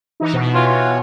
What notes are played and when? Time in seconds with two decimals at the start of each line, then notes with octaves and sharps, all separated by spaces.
0.20 E3 D#4
0.33 B2
0.54 E3 F4 F#4 C#5
0.67 F4